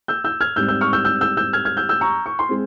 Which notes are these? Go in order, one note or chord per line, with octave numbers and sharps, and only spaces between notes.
E6 G6
E6 G6
F6 G#6
G#2 G3 C4 E6 G6
E6 G6
C#6 F6
E6 G6
E6 G6
E6 G6
E6 G6
F6 G#6
F6 G#6
E6 G6
E6 G6
A#5 C#6
C#6
C6
G#3 C4